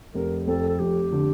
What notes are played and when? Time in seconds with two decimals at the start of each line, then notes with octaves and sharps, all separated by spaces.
0.14 F1 A#4
0.47 F2 A4
0.68 A4
0.79 F1 G4
1.12 D3